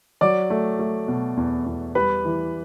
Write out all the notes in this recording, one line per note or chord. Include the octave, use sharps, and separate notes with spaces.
F#3 D5 D6
A3
A3
B2
E2
E2
G3 B4 B5
E3